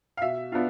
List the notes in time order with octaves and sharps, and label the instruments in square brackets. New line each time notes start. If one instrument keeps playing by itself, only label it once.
[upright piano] F5
B2 E5
B3 D4 F4 F5